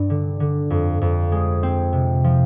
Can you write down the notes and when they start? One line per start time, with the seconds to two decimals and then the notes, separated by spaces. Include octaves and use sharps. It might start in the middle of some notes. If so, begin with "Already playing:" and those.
Already playing: G2 D4
0.10 D3
0.40 D3
0.70 F2
1.01 F2
1.32 G#3
1.63 C4
1.93 C3
2.24 F3